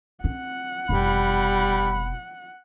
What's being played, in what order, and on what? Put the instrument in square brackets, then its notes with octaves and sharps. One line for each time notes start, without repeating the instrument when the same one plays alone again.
[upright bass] C4 [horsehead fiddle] F#5
[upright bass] F1 B2 [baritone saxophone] G3 [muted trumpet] B5